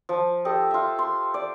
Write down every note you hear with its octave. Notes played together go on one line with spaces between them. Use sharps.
F3
G4 A4 D#5
F4 E5
C6
D5